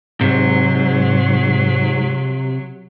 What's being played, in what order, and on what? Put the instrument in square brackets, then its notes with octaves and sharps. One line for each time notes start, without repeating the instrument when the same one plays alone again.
[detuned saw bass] G#2 [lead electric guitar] C3 [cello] F#3